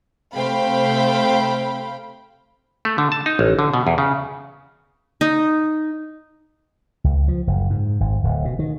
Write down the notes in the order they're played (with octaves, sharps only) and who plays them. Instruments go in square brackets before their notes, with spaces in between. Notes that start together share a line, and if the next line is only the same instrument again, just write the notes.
[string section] C3 A3 C5 F5 G5 B5
[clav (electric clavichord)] A3
D3
A5
D#4
A1
D3
B2
E2
C#3
[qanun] D#4
[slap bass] C#2
F3
F#1
G#2
G#1
D1
B2
D#3